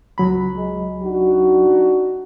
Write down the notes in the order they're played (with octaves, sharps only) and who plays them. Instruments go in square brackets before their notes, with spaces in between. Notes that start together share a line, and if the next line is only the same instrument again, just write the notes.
[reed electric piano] C#2 F#3 B5
[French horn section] G#3
D4 D#4 F#4